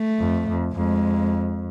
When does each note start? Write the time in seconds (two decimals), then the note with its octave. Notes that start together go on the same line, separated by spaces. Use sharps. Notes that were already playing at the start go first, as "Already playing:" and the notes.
Already playing: A3
0.19 F2
0.48 F2
0.76 F2 G#3